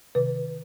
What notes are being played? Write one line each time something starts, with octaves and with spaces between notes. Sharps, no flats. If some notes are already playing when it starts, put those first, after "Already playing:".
C3 D#3 B4